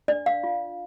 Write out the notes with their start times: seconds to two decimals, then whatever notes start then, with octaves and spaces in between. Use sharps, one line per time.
0.08 D4 D5
0.26 F5
0.44 F4